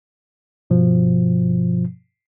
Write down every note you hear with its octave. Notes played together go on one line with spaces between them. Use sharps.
G2 B2 F3